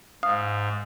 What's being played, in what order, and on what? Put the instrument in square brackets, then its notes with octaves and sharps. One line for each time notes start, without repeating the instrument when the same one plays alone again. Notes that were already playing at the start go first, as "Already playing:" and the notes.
[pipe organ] G#2 [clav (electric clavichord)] F5 [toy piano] D#6